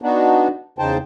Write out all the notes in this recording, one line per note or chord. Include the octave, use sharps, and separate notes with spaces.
B3 D4 D#4 F#4
E2 C#3 D#4 C5 G5 A5